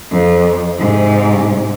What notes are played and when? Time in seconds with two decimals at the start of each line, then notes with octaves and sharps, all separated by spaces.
0.11 F2
0.78 G#2 C3